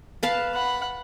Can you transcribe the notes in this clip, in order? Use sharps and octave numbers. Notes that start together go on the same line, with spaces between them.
B4 F5 A5
F#5 B5